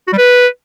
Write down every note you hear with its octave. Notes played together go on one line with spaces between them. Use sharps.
F#4
G3
B4